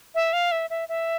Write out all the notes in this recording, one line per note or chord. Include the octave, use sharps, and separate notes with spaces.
E5
F5
E5
E5
E5